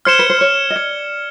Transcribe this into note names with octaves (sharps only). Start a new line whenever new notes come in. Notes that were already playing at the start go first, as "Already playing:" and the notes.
C5 F6 G#6 C#7 E7 G7
B4
C5
C#5
D#5
D5 F6 G#6 C#7 E7 G7